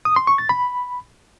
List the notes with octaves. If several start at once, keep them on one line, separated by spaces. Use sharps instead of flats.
D#6
C6
C#6
A6
B5